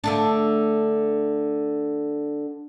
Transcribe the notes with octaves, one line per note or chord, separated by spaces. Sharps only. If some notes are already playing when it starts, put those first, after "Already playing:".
D3 A3 D4